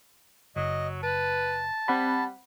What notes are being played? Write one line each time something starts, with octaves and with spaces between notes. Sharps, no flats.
F#1 F#3 D#5
B4 A5
G3 C4 F#5 B5